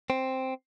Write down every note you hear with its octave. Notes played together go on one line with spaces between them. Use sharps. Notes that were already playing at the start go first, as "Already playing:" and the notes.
C4